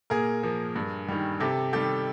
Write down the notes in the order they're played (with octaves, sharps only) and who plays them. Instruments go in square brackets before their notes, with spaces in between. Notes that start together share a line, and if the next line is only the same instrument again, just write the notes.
[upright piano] A#2 G#4 A#4
F3 A#3
G2
D#3 G3
C3 G4 A4
D#3 G3 G4 A4